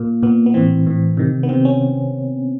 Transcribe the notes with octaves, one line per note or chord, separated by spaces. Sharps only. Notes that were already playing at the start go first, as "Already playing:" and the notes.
Already playing: A#2 A#3
A#2 B3
B3
A2 E3 C4
A2 E3
C3 D#3
B3
C3 D#3 C4
C#4